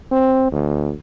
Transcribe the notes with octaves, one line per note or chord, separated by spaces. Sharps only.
C4
D2